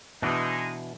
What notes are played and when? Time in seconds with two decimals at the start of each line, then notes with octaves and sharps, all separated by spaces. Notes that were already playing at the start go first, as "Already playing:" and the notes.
0.22 B2 E3 G#3 D4 D#4